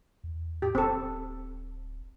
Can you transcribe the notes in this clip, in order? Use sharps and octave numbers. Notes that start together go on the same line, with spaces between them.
E2
A2 G4
D1 C4 A4